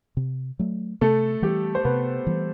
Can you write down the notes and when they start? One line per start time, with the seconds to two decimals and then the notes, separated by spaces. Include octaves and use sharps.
0.17 C3
0.59 F#3 A3
1.01 C3 A3 A4
1.42 E3 G3 G4
1.75 C5
1.85 C3 B3 B4
2.27 E3 G3